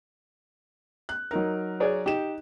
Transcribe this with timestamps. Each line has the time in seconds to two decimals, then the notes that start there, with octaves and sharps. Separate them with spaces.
1.09 F#6
1.31 F#3 D#4 A#4
1.80 G#4 C#5 D5
2.06 D#4 G4 E7